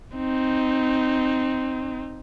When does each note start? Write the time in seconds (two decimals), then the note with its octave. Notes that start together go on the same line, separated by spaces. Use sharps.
0.16 C4 D#4